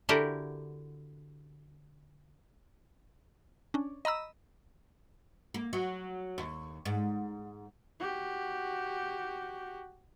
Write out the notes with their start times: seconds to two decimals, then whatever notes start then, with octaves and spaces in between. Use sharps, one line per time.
0.09 D3 E4 F#4 G4 A4 A#4
3.74 C#4 D4
4.05 D#5 A#5 B5 E6
5.54 A#3
5.73 F#3
6.38 D#2
6.86 G#2
8.00 F#4 G4